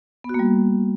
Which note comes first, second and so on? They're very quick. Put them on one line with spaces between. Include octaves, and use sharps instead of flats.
B3 F#4 A#3 G3